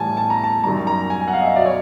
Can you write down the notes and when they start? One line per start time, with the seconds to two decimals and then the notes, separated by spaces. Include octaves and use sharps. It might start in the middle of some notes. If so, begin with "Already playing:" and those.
Already playing: A2 E3 G3 G#5 A5
0.17 A5
0.30 A#5
0.44 A5
0.63 G3 A#5
0.66 F#2 D#3
0.87 A#5
1.10 G#5
1.21 G#5
1.28 F#5
1.33 F5
1.41 D#5
1.46 E5
1.56 B2 F#3 D5
1.66 C#5